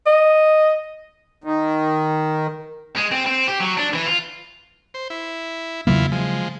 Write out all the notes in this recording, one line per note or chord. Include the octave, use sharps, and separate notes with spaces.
D#5
D#3
G#3
C4
C4
G4
F#3
D4
E3
F4
C5
E4
E2 C#3 F#3 A#3 E4 F4
F3 G#3